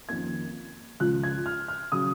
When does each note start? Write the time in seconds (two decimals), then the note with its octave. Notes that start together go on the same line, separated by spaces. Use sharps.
0.09 F2 D#3 A#3 C#4 G#6
1.00 C#2 C#3 F3 F#6
1.23 G#6
1.46 F6
1.68 F6
1.92 C#3 F#3 D#6